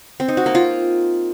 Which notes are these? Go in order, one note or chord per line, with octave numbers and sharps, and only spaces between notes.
C4
D#4
F#4
A#3
F4